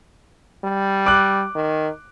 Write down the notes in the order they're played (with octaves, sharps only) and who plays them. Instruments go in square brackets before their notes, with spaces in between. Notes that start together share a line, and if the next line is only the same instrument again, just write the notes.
[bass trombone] G3
[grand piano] D6 F#6
[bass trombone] D#3